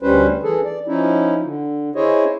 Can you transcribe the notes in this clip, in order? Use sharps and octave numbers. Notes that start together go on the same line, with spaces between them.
D2 G3 C#4 B4 C5
E3 G#4 A4
D5
F3 C#4 D#4 E4
D3
E4 G#4 C5 C#5 D#5